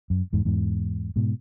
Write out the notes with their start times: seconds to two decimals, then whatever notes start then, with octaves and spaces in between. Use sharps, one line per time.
0.10 F#2
0.33 E2 G#2
0.45 E2 G#2
1.16 G#2 B2